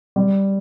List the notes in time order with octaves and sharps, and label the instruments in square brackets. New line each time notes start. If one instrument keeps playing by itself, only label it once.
[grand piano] G3